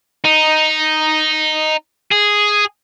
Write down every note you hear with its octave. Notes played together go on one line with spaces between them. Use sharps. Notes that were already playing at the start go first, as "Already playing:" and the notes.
D#4
G#4